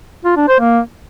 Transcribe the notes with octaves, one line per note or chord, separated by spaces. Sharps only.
F4
D4
C5
A#3